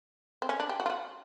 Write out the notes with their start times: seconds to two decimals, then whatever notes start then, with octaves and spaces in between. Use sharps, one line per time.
0.42 C4
0.49 C#4
0.60 D4
0.69 G4
0.80 F#4
0.86 F4
0.90 F#4